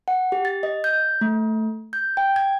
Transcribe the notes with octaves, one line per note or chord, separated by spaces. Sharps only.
F#5
G4
A6
D#5
G6
A3
G6
G5
G#6